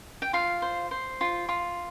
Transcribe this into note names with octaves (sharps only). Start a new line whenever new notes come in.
G5
F4 F5
C5
C5
F4
F4